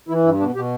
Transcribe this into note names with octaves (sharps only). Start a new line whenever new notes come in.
E3 E4
G2 E4
B2 D4
B2 G4